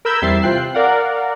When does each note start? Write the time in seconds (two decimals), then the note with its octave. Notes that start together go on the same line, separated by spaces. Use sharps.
0.05 A#4 B5 E6 G6 G#6
0.22 E2 G3 C4 E5 A6 C7
0.42 C3 C4 F4 G5 F#6 C7
0.74 A#4 D5 F5 F#5